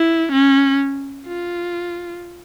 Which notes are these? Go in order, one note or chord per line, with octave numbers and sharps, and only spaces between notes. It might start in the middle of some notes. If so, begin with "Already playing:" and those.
Already playing: E4
C#4
F4